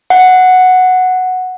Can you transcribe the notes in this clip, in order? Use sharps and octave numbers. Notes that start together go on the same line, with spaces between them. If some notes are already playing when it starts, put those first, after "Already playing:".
F#5